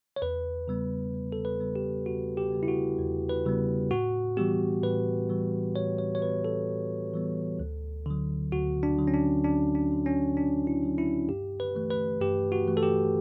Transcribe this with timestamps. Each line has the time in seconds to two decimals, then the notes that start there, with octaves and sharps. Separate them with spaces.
0.16 C#5
0.22 E2 B4
0.68 C#3 G3 B3
1.14 E2
1.32 A4
1.45 B4
1.60 C#3 G3 B3
1.76 G4
2.06 E2 F#4
2.37 G4
2.52 C#3 G3 B3
2.63 E4
2.68 F#4
2.98 E2
3.29 B4
3.45 C#3 G3 B3
3.91 A2 F#4
4.37 E3 G3 B3 G4
4.83 A2 B4
5.29 E3 G3 B3
5.76 A2 C#5
5.98 C#5
6.15 C#5
6.21 E3 G3 B3 B4
6.45 A4
6.68 A2
7.14 E3 G3 B3
7.60 D2
8.06 D3 F#3
8.52 D2 F#4
8.83 D4
8.98 D3 F#3
9.08 C#4
9.14 D4
9.44 D2 D4
9.75 D4
9.91 D3 F#3
10.06 C#4
10.37 D2 D4
10.67 E4
10.83 D3 F#3
10.98 E4
11.29 G2 G4
11.60 B4
11.75 E3 A3
11.90 B4
12.21 G2 G4
12.52 F#4
12.67 E3 A3
12.77 A4
12.83 G4